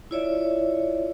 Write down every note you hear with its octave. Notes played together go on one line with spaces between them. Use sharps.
E4 F4 C#5 D5 E5